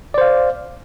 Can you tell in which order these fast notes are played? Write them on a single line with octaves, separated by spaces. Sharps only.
D5 C5 F5